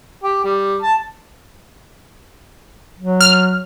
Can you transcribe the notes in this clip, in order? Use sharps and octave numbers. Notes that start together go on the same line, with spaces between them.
G4
G3
A5
F#3
F6